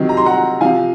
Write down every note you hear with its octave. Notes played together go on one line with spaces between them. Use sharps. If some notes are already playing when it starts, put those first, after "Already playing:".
Already playing: C3 D#3 F#3
A#5
C6
F#5 A#5
C3 F3 F5 G#5